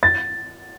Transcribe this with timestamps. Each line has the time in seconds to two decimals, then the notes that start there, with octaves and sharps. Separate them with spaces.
0.03 A6